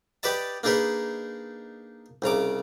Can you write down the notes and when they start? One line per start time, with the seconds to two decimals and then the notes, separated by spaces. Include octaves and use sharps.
0.23 G4 B4 D5 D#5 A5
0.63 A#3 D4 D#4 G#4 A#4 B4
2.22 C2 C#3 A#5 D6